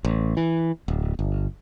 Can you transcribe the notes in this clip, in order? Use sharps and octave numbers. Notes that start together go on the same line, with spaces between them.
A1
E3
D1
G1